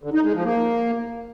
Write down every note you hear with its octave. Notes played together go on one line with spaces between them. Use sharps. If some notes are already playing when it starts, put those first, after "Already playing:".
D3
D#4
G#3
F3
A#3